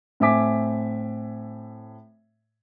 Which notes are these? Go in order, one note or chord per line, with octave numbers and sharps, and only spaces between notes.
A2 C4 E5 G#5 D6 B6